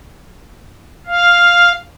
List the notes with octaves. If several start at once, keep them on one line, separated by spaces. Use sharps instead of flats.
F5